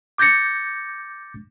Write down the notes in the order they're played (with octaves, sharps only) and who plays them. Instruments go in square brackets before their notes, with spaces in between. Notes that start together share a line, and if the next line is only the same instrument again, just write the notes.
[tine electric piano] D6 G6 A6 A#6 C#7